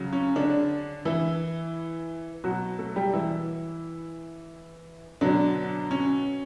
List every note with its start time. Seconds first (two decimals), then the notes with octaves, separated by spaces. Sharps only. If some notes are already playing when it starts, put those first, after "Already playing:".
Already playing: C#3 F#3
0.13 C#4
0.36 D3 D4
1.05 E3 E4
2.44 B2 F#3 F#4
2.79 A3 A4
2.96 G3 G4
3.13 E3 E4
5.21 B2 D3 F#3 D4
5.91 C#4